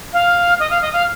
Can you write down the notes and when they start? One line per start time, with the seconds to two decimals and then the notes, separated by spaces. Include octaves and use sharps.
0.13 F5
0.60 D#5
0.70 F5
0.82 D#5
0.93 F5